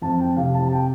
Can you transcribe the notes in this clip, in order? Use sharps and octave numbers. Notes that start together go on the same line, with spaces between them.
F2 A5
G5
C3 F5
A5
A5
G5